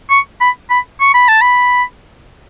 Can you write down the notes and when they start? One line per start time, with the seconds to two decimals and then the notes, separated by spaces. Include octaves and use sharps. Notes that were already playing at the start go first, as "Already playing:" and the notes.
0.10 C#6
0.41 B5
0.70 B5
1.01 C#6
1.14 B5
1.28 A5
1.42 B5